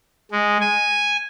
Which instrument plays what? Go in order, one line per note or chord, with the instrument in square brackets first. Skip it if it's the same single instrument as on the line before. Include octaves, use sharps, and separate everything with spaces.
[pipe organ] G#3
G#5